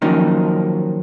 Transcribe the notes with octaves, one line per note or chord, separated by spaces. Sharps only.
D#3 F3 F#3 A#3 C#4 D#4